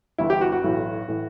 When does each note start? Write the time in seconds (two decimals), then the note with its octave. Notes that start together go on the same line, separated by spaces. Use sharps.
0.18 G1 G2 E3 E4
0.30 G4
0.41 F#4
0.52 F#4
0.64 B1 A2 E3
1.08 A2 E3